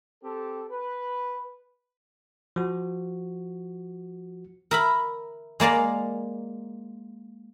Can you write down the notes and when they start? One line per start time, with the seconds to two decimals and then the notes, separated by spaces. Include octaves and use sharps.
0.23 C4 G4 A4
0.69 B4
2.56 F3 F#4
4.71 A#4 E5 B5
5.60 G#3 A#3 D5 A#5